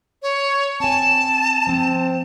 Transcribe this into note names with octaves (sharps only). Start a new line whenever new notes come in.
C#5
C4 G#5 A5
F3 C4